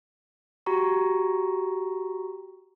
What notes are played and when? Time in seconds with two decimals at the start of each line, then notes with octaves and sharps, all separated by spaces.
0.66 F#4 G4 A#5 C#6